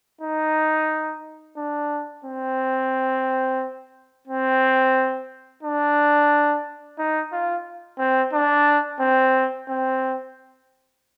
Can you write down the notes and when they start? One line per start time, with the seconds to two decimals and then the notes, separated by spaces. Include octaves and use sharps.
0.21 D#4
1.57 D4
2.24 C4
4.27 C4
5.63 D4
6.99 D#4
7.32 F4
7.99 C4
8.33 D4
9.00 C4
9.69 C4